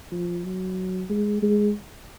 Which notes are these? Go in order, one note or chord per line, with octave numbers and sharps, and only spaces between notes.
F3
F#3
G#3
G#3